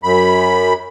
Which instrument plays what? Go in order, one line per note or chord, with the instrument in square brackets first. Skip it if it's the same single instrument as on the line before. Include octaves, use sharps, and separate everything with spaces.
[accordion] F#2 B5